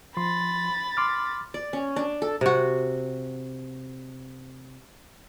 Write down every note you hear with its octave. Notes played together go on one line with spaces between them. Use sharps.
F3 B5 C6 A6
C6 D6 F6
D5
C#4
D4
A4
C3 F#4